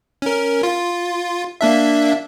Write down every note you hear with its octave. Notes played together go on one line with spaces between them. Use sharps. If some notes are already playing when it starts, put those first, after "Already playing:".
C#4 A#4
F4
A#3 D4 E5